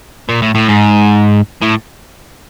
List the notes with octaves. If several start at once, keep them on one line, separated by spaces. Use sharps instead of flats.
A#2
A2
A2
G#2
A2